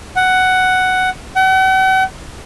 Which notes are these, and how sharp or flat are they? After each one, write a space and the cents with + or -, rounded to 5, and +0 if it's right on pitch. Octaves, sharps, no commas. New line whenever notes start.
F#5 +5
F#5 +40